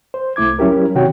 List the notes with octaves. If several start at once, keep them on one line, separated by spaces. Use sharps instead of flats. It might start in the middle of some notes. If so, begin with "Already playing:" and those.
C5
C2 A3 E4 D6 G#6
F#3 C#4 E4 G4 A#4
C3 D#3 F#4 C#5 G5